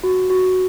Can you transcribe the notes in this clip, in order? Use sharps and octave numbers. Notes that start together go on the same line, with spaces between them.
F#4
F#4